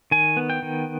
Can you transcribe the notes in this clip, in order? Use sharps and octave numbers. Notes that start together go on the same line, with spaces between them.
D#3 G#5
B3
G5
D#3